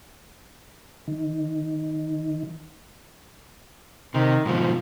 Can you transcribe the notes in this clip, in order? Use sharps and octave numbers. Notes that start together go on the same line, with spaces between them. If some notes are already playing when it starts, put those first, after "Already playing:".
D#3
C3 D#3
G#2 B2 D#3 F3